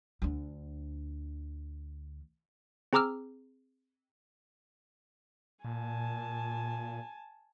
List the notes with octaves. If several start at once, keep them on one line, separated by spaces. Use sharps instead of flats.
D2 D3
C4 G#4 A#5 D6 E6 F6
A#2 G#5 A5